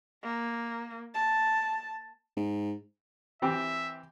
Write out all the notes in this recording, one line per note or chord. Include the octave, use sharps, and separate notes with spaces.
A#3
A5
G#2
E3 C4 G4 E5